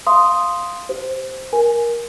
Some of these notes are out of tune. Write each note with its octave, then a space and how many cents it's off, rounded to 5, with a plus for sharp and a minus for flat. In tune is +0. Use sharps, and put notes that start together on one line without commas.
F5 +0 C6 +0 D#6 +0
G4 +0 C5 +0
A#4 +15 G#5 +0